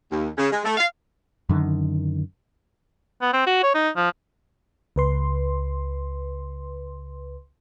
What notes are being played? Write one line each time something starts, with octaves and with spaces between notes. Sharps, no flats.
D#2
C#3
G#3
A3
F5
F#2 D3 D#3
B3
C4
F#4
C#5
D#4
F3
C#2 B4 C6